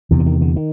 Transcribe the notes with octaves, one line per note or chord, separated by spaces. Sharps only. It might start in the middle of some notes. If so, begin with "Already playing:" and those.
E2 C3 D#3
D3
D#3
D3
D#3